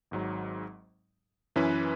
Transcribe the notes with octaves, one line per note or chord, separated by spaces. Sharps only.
G#1 G#2 F#3
F#2 E3 C#4 E4 B4